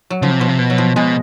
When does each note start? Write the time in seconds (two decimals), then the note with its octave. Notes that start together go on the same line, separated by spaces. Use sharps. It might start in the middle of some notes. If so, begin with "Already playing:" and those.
0.10 F#3
0.22 C#3 F3
0.30 C3
0.40 B2 F3
0.48 C3
0.59 B2
0.70 F#3
0.78 F3
0.96 B2 G#3